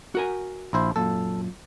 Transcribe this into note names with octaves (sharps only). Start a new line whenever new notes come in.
F#4 A#4 G#5
A#1 E4 C5
F#2 A#2 A4